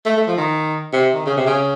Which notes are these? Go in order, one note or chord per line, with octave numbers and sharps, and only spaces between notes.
A3
A3
F3
D#3
C3
D#3
C#3
C3
C#3